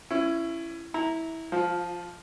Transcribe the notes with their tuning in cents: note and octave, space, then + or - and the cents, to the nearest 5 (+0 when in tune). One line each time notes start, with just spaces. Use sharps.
C#4 -5 E4 +20
E4 -20 A#5 +0
F3 +0 F4 +30